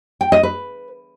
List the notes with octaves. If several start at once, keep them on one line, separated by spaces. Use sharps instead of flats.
G5
D#5
B4